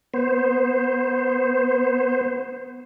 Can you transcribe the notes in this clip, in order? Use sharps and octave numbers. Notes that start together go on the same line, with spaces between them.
B3 C5